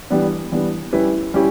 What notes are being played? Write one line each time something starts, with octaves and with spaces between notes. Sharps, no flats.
E3 G3 B3 D4
E3 G3 B3 D4
G3 C#4 E4 G4 B4
G3 C#4 E4 G4